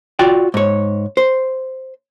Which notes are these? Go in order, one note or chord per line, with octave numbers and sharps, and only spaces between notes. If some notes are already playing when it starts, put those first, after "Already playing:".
F4 F#4 D5 G5
G#2 C#5
C5